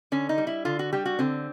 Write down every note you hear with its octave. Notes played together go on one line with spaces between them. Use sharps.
D3 C#4
D#4
G3
E4
D3 F4
F#4
G3 G4
F#4
D3 C4